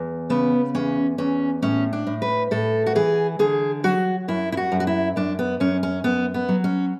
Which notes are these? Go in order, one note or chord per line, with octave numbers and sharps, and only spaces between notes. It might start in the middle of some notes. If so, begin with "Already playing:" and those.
Already playing: E2
C#3 B3
E2 C#4
E2 C#4
A2 C#4
D4
A2
B4
A2 A4
F#4
E3 G#4
D3 G#4
F#3 F#4
F#2 E4
E4
F#4
F#2
F#4
E4
F#2 D4
B3
F#2 C#4
C#4
F#2 B3
B3
F#3
C#4